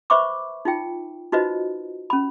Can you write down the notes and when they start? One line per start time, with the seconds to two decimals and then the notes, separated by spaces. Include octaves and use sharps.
0.10 B4 C5 E5 B5 C#6 D6
0.65 D#4 F4 G5
1.32 D#4 F4 F#4 B4 C5 D#5
2.10 C#4 B5